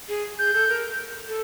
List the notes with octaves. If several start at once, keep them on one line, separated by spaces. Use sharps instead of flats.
G#4
G#4 G6
A4
A#4
A4